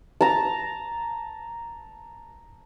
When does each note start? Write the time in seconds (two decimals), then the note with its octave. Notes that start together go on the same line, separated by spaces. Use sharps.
0.21 A5 A#5